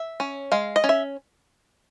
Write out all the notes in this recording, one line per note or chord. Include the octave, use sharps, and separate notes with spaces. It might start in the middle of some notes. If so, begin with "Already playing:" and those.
Already playing: E5
C#4
G#3 F5
D#5
C#4
E5